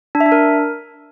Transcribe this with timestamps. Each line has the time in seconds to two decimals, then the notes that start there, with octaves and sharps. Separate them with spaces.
0.15 D4
0.20 E5
0.26 D4
0.32 A#4